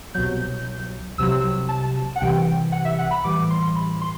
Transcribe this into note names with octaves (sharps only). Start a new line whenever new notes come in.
C2 B2 F#3 G6
C2 C3 F#3 E6
A5
F#5
C2 C3 E3 G5
F#5
E5
F#5
B5
A2 E3 G3 D6
C6
B5
C6